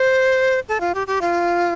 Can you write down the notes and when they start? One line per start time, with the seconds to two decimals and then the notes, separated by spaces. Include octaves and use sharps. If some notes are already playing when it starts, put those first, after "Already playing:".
Already playing: C5
0.69 A4
0.81 F4
0.95 G4
1.07 G4
1.21 F4